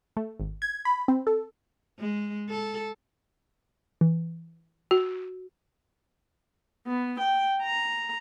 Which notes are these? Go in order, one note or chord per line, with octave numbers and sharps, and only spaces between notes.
A3
G#1
G#6
B5
C4
A4
G#3
A4
E3
F#4
B3
G5
A#5